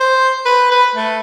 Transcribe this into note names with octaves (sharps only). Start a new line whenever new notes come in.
C5
B4
B4
A3